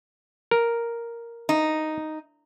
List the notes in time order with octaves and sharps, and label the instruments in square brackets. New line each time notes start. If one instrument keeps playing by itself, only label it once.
[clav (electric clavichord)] A#4
[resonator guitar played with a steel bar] D#4